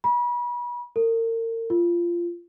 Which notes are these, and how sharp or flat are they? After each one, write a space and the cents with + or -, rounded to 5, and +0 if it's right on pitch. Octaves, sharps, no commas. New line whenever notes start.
B5 -35
A#4 -40
F4 -15